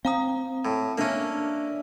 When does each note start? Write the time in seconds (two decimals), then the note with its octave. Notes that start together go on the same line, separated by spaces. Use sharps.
0.05 C4 F5 A#5 D#6
0.65 A2
0.98 A#3 C#4 D4 D5 E5